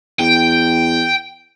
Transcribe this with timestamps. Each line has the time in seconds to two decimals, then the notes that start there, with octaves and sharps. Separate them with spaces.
0.20 E2 G5